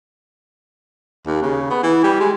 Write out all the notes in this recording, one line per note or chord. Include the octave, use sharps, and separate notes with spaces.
D#2
C#3
B3
E3
G3
G#3